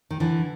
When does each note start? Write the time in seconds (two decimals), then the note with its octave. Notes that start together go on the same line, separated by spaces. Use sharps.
0.11 D#3
0.20 D3 E3